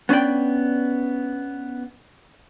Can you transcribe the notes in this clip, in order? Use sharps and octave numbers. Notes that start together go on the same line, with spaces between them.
B3 C#4 D4 D5 G5